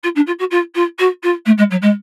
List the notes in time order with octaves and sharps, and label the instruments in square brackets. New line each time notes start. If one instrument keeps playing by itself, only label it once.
[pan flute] F4
D4
F4
F#4
F4
F4
F#4
F4
A3
G#3
F#3
G#3